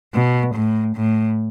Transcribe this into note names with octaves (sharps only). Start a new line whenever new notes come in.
B2
A2
A2